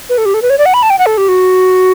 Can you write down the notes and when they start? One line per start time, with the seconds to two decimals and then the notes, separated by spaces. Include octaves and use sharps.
0.09 B4
0.18 A4
0.26 G4
0.34 A4
0.42 B4
0.50 C#5
0.58 D5
0.66 F#5
0.74 B5
0.83 A5
0.90 G5
0.99 F#5
1.06 A4
1.18 G4
1.28 F#4